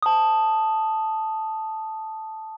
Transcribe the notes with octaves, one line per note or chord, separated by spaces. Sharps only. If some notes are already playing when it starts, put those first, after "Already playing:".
A5 D#6